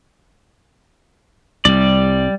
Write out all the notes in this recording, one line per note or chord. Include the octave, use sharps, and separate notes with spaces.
C2 G3 D5